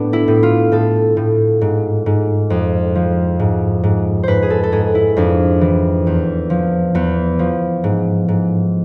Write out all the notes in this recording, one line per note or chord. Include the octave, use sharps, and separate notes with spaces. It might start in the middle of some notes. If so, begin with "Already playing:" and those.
Already playing: A2 B3 D4
E4
A2
F4
A2 A4
A2
G#2
G#2
F2
F3
G#2
G#2
G#2 B4 C5
G#4
A4
A4
G#2 G#4
E4
F2 D4
E3
E2
F3
E2 B3
F3
G#2
G#2